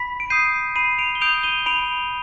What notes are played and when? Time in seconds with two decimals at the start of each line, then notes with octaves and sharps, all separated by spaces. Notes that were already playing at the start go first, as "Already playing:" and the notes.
Already playing: B5 B6
0.20 D7
0.30 D#6 G6 C7 D#7
0.75 B5 C7 D#7
0.99 D7 F7
1.15 G7
1.21 D#6 G6 D7 F7
1.43 D#7 G7
1.66 B5 D7 F7